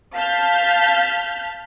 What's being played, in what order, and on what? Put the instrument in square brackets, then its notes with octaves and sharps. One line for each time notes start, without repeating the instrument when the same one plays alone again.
[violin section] F5 A5 F6 G6 B6